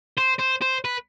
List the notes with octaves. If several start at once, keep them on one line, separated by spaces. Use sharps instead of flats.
C5
C5
C5
B4